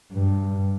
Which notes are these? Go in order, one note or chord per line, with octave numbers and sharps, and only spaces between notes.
G2